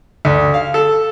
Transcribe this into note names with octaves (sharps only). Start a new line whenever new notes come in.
D2
F5
A4